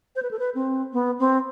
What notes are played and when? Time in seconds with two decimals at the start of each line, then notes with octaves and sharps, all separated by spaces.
0.16 C5
0.23 B4
0.31 A4
0.39 B4
0.55 C4
0.93 B3
1.19 C4